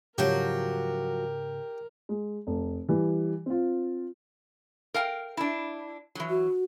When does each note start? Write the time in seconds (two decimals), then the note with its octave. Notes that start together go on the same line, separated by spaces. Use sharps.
0.18 G#2 C#3 F3 F#3 F#4 G4 A#4
2.09 G#3
2.47 F1
2.89 E3 G3
3.46 C4 F4
4.94 A#4 F5 G5
5.37 D4 E4
6.15 E3 F#3
6.30 F#4